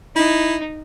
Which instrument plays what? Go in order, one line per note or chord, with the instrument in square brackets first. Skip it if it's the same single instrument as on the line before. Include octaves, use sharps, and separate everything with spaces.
[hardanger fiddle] D#4 [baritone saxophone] E4